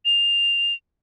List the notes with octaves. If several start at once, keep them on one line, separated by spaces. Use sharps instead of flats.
F7